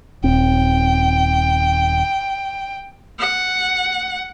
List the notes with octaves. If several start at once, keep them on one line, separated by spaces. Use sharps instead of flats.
D#1 C4 G5
F#5